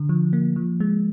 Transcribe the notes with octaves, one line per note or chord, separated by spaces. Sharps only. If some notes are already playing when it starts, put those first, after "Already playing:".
Already playing: D3
F3
A#3
F3
G#3